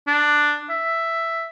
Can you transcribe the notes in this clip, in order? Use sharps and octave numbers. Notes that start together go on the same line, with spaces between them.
D4
E5